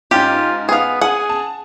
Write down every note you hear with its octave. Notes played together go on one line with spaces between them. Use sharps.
G#2 C#4 F4 G4
B3 G#4 F5
G#4 F#5 G#5
A5